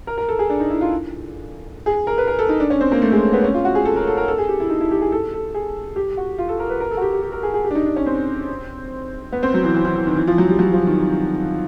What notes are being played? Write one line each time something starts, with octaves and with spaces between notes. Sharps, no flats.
A#4
A#4
A4
G#4
D4
D#4
E4
F4
G#4
A#4
B4
A#4
A4
D#4
D4
C#4
C4
A#3
A3
G#3
B3
C#4
F4
F#4
G#4
A4
A#4
A4
A#4
A4
G#4
G4
E4
D#4
E4
G4
G#4
A4
A4
G#4
G4
F#4
F4
A4
A#4
B4
A#4
A4
F#4
G4
G4
G4
A#4
G#4
G#4
G4
D4
D#4
D4
C#4
C4
B3
C4
F#3
E3
E3
E3
E3
D#3
E3
F3
F#3
G3
F#3
F3
D#3